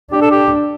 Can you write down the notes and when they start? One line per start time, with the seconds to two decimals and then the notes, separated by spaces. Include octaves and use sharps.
0.12 D4 G4
0.22 A4
0.31 G4